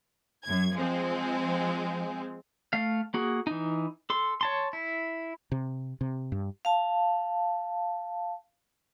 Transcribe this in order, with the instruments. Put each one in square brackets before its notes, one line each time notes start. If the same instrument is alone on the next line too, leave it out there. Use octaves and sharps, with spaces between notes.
[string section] F#2 G#6
F3 G#3 C4
[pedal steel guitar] A3 F5
A#3 F#4 G#4
E3 D#4
A4 C6
C#5 A5 C6
E4
[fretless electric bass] C3
C3
G2
[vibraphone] F5 A5